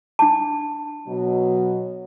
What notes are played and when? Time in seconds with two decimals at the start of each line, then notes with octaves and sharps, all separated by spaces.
0.19 D4 A5
1.07 B2 F#3